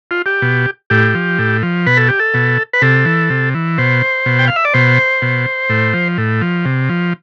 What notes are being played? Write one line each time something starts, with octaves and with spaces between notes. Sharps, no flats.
F4
G4
B2
A2 G4
F3
A2
F3
B2 B4
A4
G4
A4
B2
B4
C3 A4
E3
C3
E3
B2 C5
B2
G5
F5
E5
D5
B2 C5
B2
A2
F3
A2
F3
C3
F3